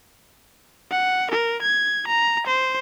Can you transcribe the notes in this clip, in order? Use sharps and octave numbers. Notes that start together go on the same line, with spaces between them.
F#5
A#4
G#6
A#5
C5